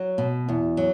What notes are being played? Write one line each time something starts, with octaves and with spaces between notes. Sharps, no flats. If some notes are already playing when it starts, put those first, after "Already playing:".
Already playing: F#3 F#4
B2
E2
F#3